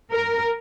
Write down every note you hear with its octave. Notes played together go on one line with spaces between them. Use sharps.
A#4